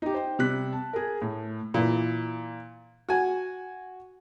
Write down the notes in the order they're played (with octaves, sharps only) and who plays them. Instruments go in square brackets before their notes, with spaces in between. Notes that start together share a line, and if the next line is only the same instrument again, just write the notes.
[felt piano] D#4 G4
C5 G5
C3 G3 F#6 B6
A5
G#4 A#4
A2
[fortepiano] A#2 E3
F#4 G#5